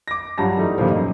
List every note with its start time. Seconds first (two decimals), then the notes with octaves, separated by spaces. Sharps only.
0.08 D6 A#6
0.38 G2 F#3 F4 A5 A#6
0.57 E3 G3 A3 D#4
0.78 G2 A#2 D#3 F3
0.91 F#2 D#5